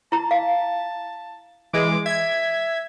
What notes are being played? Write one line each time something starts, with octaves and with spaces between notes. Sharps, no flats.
E4 A5 A#5
F5
E3 G#3 G#4 D6
E5 G#6